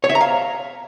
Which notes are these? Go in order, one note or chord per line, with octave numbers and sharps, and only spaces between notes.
C#5
E5
A#5
F5